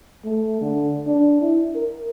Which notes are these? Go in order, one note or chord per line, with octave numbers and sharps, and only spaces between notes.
A3
D3
D4
E4
A#4